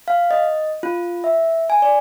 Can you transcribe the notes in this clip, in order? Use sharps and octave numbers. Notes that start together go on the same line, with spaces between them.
F5
D#5
F4
E5
G#5
D5